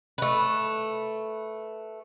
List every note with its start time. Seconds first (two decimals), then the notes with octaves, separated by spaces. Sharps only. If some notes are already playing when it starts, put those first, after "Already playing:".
0.18 A3 B4